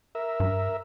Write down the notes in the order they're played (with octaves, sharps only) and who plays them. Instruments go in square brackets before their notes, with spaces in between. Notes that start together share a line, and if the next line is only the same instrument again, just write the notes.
[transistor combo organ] A#4 E5
[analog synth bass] G2